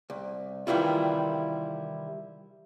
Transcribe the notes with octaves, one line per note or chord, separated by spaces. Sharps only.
C2
C3 D#3 E3 G3 E4 F4